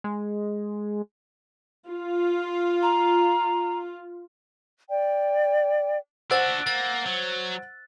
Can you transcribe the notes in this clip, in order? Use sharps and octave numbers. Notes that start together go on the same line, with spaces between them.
G#3
F4
A#5
D5 G5
D4 F#4 C5 F#5 E6 F#6 A6
A#3 A6
F#3